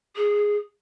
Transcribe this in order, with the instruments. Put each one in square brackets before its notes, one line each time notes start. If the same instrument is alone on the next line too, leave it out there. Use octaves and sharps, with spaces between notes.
[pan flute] G#4